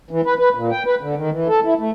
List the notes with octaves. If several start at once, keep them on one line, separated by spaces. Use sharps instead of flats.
E3
B4
B4
A#2
G5
B4
D3
D#3
E3
A4
E4
A3